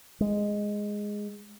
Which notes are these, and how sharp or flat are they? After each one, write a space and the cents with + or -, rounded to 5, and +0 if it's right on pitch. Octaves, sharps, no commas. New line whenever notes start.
G#3 -5